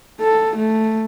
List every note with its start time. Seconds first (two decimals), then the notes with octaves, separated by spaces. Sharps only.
0.20 A4
0.56 A3